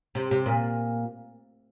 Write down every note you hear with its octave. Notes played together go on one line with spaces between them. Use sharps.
C3
C3
A#2